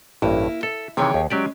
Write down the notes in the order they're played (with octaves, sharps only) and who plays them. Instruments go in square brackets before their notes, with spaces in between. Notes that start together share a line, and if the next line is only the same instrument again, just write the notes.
[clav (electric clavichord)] A1 G2 [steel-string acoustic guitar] A#3 E4
[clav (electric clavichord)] A4 [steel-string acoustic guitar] E5
[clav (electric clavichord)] C3 D#3 E3 [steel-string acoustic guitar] G#4 C#5 G5
[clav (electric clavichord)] D#2
[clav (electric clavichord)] F#3 G4 D5 [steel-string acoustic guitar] G#3 C#4